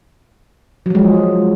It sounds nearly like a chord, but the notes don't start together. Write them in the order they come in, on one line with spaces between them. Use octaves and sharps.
F#3 F3 G#3